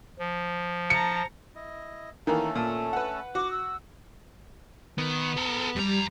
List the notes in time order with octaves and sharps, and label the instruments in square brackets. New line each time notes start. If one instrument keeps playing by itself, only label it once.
[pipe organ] F3
[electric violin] A5 A#5 [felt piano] C#7
[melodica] E4 D#5
[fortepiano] D#3 E3 A#3 [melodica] A3 C#4 A4 [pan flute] A#5
[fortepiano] A#2 [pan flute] A5
[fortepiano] B4 F#5
[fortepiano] F#4 [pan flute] D6
[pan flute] E6
[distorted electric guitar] D#3 [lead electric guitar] B3
[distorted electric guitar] A4 A#4
[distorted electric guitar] F2 A#5 [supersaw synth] G3